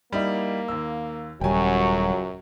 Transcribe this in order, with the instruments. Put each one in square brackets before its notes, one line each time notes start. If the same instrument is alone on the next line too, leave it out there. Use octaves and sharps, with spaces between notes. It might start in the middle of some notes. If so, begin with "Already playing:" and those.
[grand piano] G3 D#4 E4 [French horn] A#3
[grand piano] D#2 E6
[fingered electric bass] D#1 G3 [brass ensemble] C#2 F#3 [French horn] F#2 [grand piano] G5 G#5